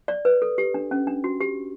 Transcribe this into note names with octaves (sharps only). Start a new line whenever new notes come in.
D5
B4
A4
G4
D4
C#4
D4
F#4
G4